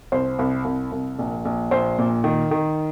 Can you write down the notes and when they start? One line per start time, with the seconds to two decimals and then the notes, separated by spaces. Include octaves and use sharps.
0.12 C2 C5
0.39 C2
0.65 C2
0.92 C2
1.19 A#1
1.45 A#1
1.71 A#1 C5
1.98 A#2
2.24 D#3
2.51 D#3